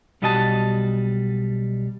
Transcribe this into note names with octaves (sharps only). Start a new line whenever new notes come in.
B1 G3 F#4 D#5 F#5 A5